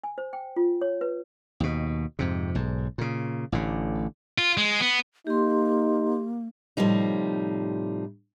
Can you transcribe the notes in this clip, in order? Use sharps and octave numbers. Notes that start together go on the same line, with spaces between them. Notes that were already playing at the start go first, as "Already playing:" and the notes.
G#5
C5
G5
F4
C#5
B4
D#2 B2
F2 G#2 C3
B1 G#2
A#2 C#3
A1 A2 D3
F4
G#3
B3
A#3 D#4 G4 C6
A2 C3 F3 G3 D#4